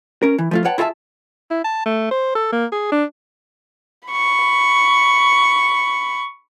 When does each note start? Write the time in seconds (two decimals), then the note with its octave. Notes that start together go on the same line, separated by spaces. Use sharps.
0.23 C#4 A#4
0.38 E3
0.51 F3 A3 F4
0.64 B4 C#5 F#5 G5 A5
0.78 E4 F4 G#4 E5 A5
1.51 E4
1.64 A5
1.86 A3
2.11 C5
2.35 A4
2.52 A#3
2.72 G#4
2.92 D4
4.09 B5 C#6